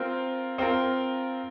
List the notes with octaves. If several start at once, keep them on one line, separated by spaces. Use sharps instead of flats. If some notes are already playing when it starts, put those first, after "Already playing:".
Already playing: C4 F4 A#4
C4 F4 A#4